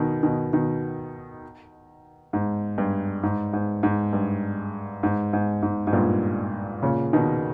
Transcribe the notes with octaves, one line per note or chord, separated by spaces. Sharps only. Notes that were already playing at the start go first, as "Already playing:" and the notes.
Already playing: B2 D#3
B2 D#3
B2 D#3
G#2
G2
G#2
G#2
G#2
G2
G#2
G#2
G#2
G#2
G2 A#2
A#2 C#3
B2 D#3